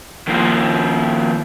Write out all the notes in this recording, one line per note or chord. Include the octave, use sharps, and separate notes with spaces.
D#3 F3 A#3 F4